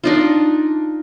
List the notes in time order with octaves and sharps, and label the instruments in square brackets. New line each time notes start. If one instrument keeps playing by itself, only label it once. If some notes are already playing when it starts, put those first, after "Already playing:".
[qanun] D4 D#4 F4